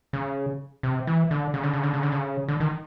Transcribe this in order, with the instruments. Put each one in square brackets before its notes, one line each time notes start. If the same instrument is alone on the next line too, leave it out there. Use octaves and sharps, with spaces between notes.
[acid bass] C#3
C3
E3
D3
C#3
D3
C#3
D3
C#3
D3
C#3
D3
D#3